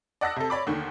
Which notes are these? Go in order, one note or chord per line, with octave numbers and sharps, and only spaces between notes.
D5 D#5 F#5 A5 E6 A#6
C3 A4
C#5 D5 B5 D6
D#2 D3 D#3